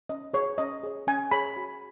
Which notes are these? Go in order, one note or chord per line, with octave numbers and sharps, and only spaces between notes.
C#4 D#5
G#4 B4 C#5
C#4 D#5
G#4 C#5
C#4 G#5
G#4 C#5 B5
F#4